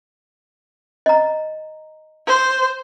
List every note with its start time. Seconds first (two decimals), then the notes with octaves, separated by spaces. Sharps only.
1.06 D#5 A#5
2.27 C5